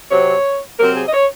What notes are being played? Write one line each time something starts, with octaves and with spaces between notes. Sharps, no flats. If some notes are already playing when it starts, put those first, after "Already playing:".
C3 F#3 C4 C#5
C3 F#3 C4 A#4
G#4
D#5
C#5